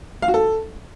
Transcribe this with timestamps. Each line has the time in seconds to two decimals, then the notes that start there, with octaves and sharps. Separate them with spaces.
0.22 F5
0.28 F#4
0.34 A4